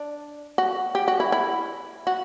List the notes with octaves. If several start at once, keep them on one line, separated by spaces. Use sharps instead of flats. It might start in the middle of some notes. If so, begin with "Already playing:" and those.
Already playing: D4
F#4
G4
F#4
E4
E4
F#4